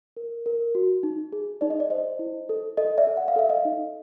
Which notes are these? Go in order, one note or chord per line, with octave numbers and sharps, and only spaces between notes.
A#4
A#4
F#4
D#4
G#4
D#4 D5
D#5
D5
C5 D#5
E4
A4
A4 D#5
D5 E5
A4
F#5
F5
A4 E5
D#5 F5
D#4